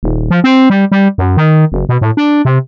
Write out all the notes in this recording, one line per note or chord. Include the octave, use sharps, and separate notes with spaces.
D#1
F3
C4
G3
G3
F#2
D#3
F#1
B2
A2
D4
C3